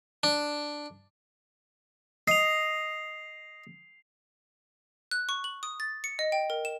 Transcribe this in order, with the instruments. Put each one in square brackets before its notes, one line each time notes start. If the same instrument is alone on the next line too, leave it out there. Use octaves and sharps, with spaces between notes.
[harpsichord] D4
[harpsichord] D#5 [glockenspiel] C7 F7
[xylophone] F#6
C#6
F#7
D#6
A6
C#7
D#5
G5
A#4
E7